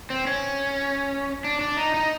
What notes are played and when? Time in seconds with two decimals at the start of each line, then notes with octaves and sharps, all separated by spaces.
0.10 C4
0.27 C#4
1.45 D4
1.61 D4
1.77 D#4
1.94 D#4